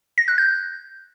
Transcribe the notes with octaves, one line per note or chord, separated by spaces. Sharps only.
A#6
F#6
G6